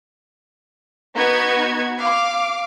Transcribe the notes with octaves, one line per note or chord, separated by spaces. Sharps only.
B3 D#4 F#4 B4 G#6
F5 D6